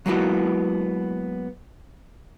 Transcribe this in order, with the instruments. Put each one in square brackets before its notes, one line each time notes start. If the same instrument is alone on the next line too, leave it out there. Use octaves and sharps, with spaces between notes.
[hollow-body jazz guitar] F#3 G#3 A#3 B3 E4 F#4